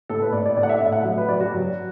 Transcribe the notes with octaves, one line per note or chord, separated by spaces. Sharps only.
A2 A4
B4
A2 D5
D5
A2 D5
F#5
E5
A2 E5
F#5
F#3 E5
B4
F#3 D5
F#4
F#2